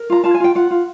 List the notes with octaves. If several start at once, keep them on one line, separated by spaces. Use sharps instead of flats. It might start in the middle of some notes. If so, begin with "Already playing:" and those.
Already playing: A#4
F4 A#5
F4 A5
G#5
F4 G5
F4 F#5
F4